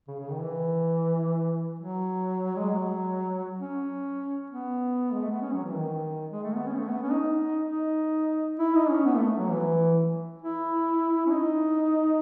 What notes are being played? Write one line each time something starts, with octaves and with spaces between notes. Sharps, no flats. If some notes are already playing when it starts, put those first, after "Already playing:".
C#3
C#3
D#3
E3
F#3
G#3
F#3
C#4
B3
G#3
A3
B3
C#4
F#3
E3
D#3
G#3
A3
B3
C#4
A3
B3
C#4
D#4
D#4
E4
D#4
C#4
B3
A3
F#3
E3
E4
C#4
D#4